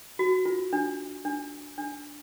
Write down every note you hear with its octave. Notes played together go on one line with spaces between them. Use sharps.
F#4
F4
D4
D4
D4